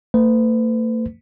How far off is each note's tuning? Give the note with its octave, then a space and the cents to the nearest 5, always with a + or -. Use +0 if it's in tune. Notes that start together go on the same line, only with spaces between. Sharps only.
A3 +45 B4 +40